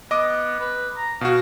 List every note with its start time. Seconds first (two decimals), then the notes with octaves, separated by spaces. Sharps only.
0.11 B3 D#5 D6
0.60 B4
0.96 A#5
1.21 B2 F#4 F5